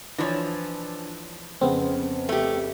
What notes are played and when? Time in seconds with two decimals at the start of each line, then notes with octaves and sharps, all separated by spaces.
0.18 E3 F3 D4 C#5
1.61 F2 C#3 B3 C4
2.29 A3 G4